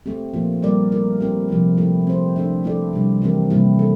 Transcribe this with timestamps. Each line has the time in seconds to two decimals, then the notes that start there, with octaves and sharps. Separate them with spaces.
0.06 A3 C4 G4
0.33 A#2 F3 A#3 F4
0.62 G3 A#3 F4 A#4 D5
0.92 A3 E4 A#4
1.20 C4 E4 G4 A#4
1.49 C3 F3 C4 E4 G4
1.77 F3 A3 E4
2.07 C4 G4 C5
2.36 A3 D4 A4 E5
2.64 A3 E4 A4 D5
2.93 C3 G3 D4
3.22 E3 A3 C4 G4 A#4
3.50 C3 G3 A#3 E4
3.79 A4